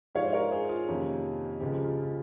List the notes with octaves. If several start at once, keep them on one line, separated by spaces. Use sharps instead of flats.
G#2 F3 G#3 C#5 F5
C5
A#4 C#5
G#4 C5
F4 G#4
F2 C3 D#3 A#3 C#4
C#2 C#3 F3 G#3 G4
F4
F4